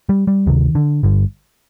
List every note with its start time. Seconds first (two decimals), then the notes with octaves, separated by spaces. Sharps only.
0.09 G3
0.27 G3
0.47 D2 C3 D#3
0.75 D3
1.03 G1 G2 D3